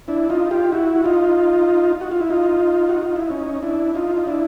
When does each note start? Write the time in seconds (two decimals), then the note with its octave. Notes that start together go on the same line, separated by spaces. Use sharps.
0.08 D4 E4
0.29 D#4 F4
0.51 F4 G4
0.72 E4 F#4
0.95 F#4
1.04 D#4 F4
2.01 F#4
2.11 F4
2.20 E4
2.30 D#4 F4
2.89 F#4
3.02 F4
3.16 E4
3.30 C#4 D#4
3.62 D4 E4
3.95 D#4 F4
4.17 D#4
4.27 D4 E4